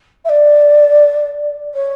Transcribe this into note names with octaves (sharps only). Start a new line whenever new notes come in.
E5
D5
C#5